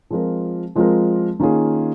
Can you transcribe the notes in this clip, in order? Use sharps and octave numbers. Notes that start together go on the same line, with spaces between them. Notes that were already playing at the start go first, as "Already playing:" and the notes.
F3 G#3 C4 F4 A#4
F3 G#3 C4 F4 A#4
D#3 A#3 C#4 F4 G#4